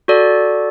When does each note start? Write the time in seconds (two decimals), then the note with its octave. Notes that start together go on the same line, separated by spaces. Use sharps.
0.08 F#4 A4 D5